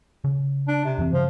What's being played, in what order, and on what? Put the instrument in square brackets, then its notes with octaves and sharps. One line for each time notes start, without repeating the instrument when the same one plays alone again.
[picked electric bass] C#3
[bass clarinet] D4
C3
[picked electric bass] F2 E3 C4
[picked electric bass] G2 C#3 [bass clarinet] F3